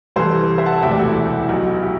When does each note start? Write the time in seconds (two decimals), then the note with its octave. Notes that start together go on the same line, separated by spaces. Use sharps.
0.16 C2 C3 E3 A4 C5
0.58 C5 E5
0.66 F#5 A5
0.83 E1 D2 C3 E3 E5 G5
0.91 D5 F#5
0.99 F#4 A4
1.07 E4 G4
1.49 B1 B2
1.83 E4 G4